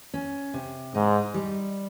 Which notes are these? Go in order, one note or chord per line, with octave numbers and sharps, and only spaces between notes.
C#4
C3
G#2 D#4
G3